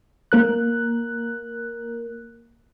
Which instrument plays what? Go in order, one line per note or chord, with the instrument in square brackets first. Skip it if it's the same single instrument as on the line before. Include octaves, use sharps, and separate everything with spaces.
[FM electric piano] A#3 A#4 F#6